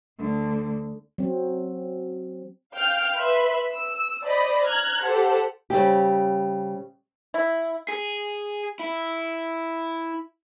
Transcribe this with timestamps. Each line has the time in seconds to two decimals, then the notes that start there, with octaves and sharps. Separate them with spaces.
0.18 D2 D3
1.18 F#3 C4
2.74 F5 G5 F6
3.16 B4 E5 B5 C6
3.73 E6
4.23 C5 D5 D#5 B5
4.66 A#5 F6 F#6 G#6
5.03 G4 A4 C5 F#5
5.70 C#3 G3 C4 G4
7.34 E4
7.88 G#4
8.80 E4